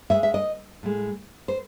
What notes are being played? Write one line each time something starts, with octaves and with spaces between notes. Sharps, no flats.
A2 G#3 E5
E5
D#5
A2 G#3
C5